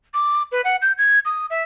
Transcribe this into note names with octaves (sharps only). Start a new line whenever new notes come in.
D6
B4
F#5
G6
G#6
D#6
E5